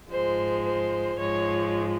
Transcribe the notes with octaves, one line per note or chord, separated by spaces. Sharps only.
G#2 F3 G#3 C5
C5
G#2 F3 G#3 C#5